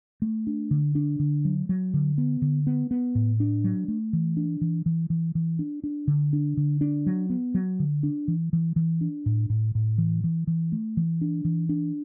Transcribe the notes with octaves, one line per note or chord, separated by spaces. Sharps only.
A3
D4
D3
D4
D3
F#3
F#3
D3
B3
D3
B3
B3
A2
D4
F#3
A3
E3
D4
E3
E3
E3
E3
D4
D4
D3
D4
D3
D4
F#3
B3
F#3
D3
D4
E3
E3
E3
D4
A2
A2
A2
E3
E3
E3
A3
E3
D4
E3
D4